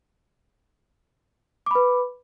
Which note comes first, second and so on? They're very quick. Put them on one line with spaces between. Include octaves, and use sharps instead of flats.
D6 B5 B4